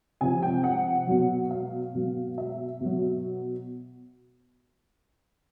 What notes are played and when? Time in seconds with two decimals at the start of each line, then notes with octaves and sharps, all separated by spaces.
0.21 C3 F3 G#5
0.42 G5
0.64 F#5
1.07 B2 F#3
1.51 F5
1.95 B2 F#3
2.38 E5
2.81 B2 F#3